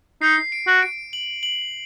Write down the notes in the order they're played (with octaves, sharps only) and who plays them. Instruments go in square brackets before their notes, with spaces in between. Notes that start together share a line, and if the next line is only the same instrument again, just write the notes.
[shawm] D#4 [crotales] C7
[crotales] D7
[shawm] F#4
[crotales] D7
F#7
F#7